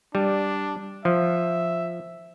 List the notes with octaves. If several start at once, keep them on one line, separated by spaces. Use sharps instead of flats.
G3 D4
F3 E5